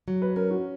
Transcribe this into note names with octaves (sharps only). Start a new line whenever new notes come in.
F#3
B4
C#4 A#4
F#4